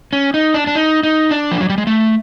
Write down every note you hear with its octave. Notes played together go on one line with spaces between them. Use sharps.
C#4
D#4
D4
D4
D#4
D#4
D4
F3
F#3
G3
G#3
A3